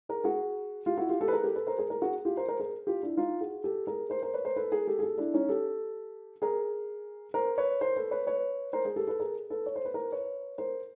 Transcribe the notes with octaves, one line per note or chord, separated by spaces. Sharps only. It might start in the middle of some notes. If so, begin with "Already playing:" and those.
G#4 A#4
F#4 G#4
F4 G4
E4 F#4
F4 G4
G4 A4
B4
G#4 A#4
G4 A4
A4 B4
A#4 C5
G#4 A#4
G#4 A#4
F#4 G#4
F4 G4
A#4 C5
A#4 C5
G#4 A#4
F4 G4
D4 E4
D#4 F4
F#4 G#4
G4 A4
G#4 A#4
A#4 C5
A#4 C5
B4 C#5
A#4 C5
A4 B4
G#4 A#4
G4 A4
G#4
G4 A4
D4 E4
C#4 D#4
G4 A4
G#4 A#4
A#4 C5
B4 C#5
A#4 C5
A4 B4
B4 C#5
B4 C#5
A#4 C5
G#4 A#4
G4 A4
A4 B4
G#4 A#4
A4 B4
C#5
C5
B4
A#4 C5
B4 C#5
A#4 C5